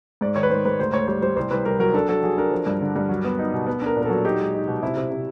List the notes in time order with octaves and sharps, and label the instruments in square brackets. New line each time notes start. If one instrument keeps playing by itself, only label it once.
[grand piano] G#2 D5
D#3 C#5
B4
G#2 C5
G#2 B4
D2 C5
D2 C#5
G3 C#5
G3 C5
C2 C5
C2 B4
C2 A#4
F#3 A#4
D4 A4
F#3 A4
F#3 G#4
D4 A#4
F3
G2
D3
G2
F#3
B3
D#4
B2
B3
D4 A#4
A#2
A#4
F#3 A4
D#4 G4
G#3
D#4
B2
C3 E4
C3
C3